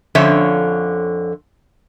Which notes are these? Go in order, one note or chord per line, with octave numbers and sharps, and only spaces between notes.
F2 D3 F3 C#4 C#5 E5